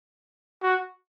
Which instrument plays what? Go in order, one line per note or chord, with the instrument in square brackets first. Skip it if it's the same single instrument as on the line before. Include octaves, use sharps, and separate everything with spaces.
[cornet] F#4